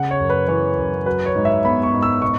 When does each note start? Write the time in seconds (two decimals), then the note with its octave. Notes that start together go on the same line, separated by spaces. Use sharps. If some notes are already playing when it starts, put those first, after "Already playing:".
Already playing: C#3 F#5
0.11 C#5
0.20 F#2
0.30 B4
0.48 E3 C#5
0.78 F#2
1.06 F#3 B4
1.26 C#5
1.35 G#2
1.45 E5
1.65 B3 B5
1.83 C#6
1.93 G#2
2.03 E6
2.22 B2 C#6